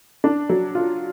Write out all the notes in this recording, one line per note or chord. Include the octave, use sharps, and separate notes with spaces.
D4
F#3
F4